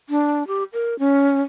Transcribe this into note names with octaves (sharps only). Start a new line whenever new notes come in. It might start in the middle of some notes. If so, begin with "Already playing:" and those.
D4
G4
A#4
C#4